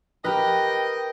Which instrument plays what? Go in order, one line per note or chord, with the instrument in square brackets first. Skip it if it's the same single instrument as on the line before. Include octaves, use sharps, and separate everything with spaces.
[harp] G4 A#4 B4 [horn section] D#5 G5